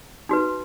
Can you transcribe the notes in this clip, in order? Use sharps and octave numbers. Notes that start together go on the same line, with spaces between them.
D#4 F#4 B4